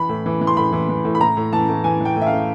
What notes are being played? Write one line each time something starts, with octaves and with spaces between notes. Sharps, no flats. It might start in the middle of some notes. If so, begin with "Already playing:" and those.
Already playing: E3 B5
A2
E3
E3
C6
A2 B5
E3
E3
A2
B5
A2 A#5
A2
E3 A5
A2
E3 G#5
E3 G5
A2
E5
F5
A2